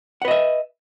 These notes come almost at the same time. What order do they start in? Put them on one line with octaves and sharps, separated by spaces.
F#5 B4 D#5 E5